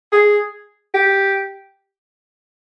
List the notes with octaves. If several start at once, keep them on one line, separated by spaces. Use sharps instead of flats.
G#4
G4